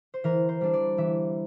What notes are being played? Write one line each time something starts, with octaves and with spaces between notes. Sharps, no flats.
C5
E3 A#4
C5
G3 D4
D5
E3 E5